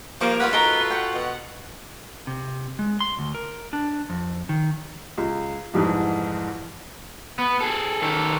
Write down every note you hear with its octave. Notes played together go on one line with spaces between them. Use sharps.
F3 G3 A#3 C#6 D7
F4 B4 C#5 F#5 F6
D#4 F4 F#4 A4 A#4 A#5 G7
F#5 G5 C#6
B2
C3
G#3
C6
D2
A#4
D4
F2
D#3
C#2
C2 F2 G#2 E3
B3
G#4 A4
D#3 A4